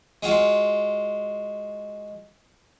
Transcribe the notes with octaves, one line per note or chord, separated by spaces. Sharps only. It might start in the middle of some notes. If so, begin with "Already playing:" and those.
G#3 F4 F#4